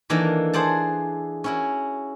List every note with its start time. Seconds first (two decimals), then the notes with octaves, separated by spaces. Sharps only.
0.10 D#3 E3 A#3 D4 A4 A#5
0.53 G#4 C5 D5 F#5 A5
1.44 C#4 E4 F#4